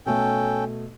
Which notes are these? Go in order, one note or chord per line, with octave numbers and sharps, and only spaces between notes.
B2 A3 C#4 A4 G5